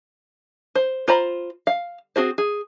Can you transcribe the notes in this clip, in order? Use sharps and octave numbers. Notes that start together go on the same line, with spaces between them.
C5
F4 C5 A#5 B5
F5
C4 F#4 G#4 C5
G#4